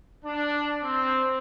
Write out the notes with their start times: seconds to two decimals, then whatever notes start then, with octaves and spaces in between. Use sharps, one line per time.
0.25 D4
0.82 C4